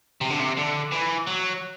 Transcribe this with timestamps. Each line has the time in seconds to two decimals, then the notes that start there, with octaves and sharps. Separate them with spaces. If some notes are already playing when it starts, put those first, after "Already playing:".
0.21 C3
0.30 D3
0.40 C3
0.57 D3
0.92 E3
1.28 F#3